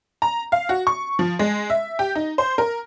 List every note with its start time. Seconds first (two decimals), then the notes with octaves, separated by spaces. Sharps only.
0.22 A#5
0.52 F5
0.69 F#4
0.87 C#6
1.19 F3
1.39 G#3
1.70 E5
1.99 G4
2.15 D#4
2.38 C5
2.58 A#4